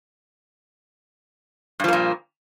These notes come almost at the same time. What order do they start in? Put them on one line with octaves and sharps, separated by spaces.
G2 F3 A#3 A#2